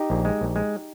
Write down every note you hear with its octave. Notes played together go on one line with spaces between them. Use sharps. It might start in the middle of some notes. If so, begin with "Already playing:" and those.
Already playing: D#4 G4
A#1
G#3
A#1
G#3